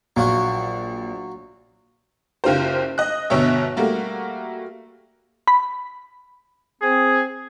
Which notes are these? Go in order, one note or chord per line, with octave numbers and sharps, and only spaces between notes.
A#1 F#3 F4 F#4
F#1 F4 G4 C5
D#5 F#6
G1 B2 C#5 E5
G3 A3 A#3 F#4
B5
C4 G#4